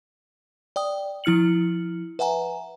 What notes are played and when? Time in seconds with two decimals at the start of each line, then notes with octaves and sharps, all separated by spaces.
0.76 D5 G5 D#6
1.24 F3 E4 F6 C#7 F#7
2.19 B4 E5 F#5 G#5 A#5